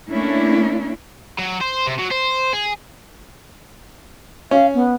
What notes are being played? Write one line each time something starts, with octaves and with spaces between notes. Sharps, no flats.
A3 A#3 C#4 D4 E4
F#3
C5
C3
F#3
C5
G#4
C#4 F5
B3